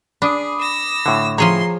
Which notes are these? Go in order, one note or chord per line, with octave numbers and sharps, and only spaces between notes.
D4 G#4 B5 D6 D#6
E6 A#6
A2 D3
F3 G#4 C#5 A#5 C6